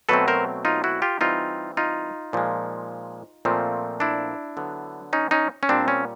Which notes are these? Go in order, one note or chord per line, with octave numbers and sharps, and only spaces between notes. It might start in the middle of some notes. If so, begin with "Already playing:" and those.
B2 F#3 A3 C4 A4 B4
A#4 C5
D#4 F4
E4 F#4
F4 G4
E3 G3 C4 D#4 F4
D#4 F4
A#2 F3 G#3
A#2 F3 A3 C4
D4 E4
D3 F#3 B3
C#4 D#4
C#4 D#4
C#4
A#2 G3 C4 D4
C#4